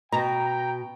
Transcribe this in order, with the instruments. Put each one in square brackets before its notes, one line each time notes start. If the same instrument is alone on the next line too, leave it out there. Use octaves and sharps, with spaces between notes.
[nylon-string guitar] B2 [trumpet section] G5 [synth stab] A#5